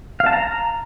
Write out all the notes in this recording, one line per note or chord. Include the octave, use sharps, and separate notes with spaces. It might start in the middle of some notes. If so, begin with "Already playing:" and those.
F5
A5
A#5